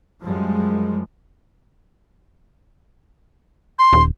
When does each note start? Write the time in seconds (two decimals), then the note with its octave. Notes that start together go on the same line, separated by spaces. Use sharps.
0.21 F#2 F3 G3 G#3
3.79 C6
3.93 D#1